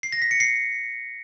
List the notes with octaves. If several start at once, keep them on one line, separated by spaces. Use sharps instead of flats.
C7
A#6
B6
C#7
C7